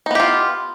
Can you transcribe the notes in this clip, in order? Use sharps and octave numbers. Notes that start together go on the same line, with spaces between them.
B3 D#4 F4 G4